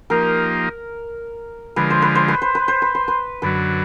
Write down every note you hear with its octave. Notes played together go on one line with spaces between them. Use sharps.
F3 A#3 D#4 G4 A#4
D3 F3 G#3 B4
C5
B4
C5
B4
C5
B4
C5
B4
C5
B4
F#2 D3 F#3 B4